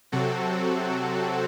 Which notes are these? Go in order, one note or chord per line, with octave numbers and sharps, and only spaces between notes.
C3 F#3 C4 F#4 A4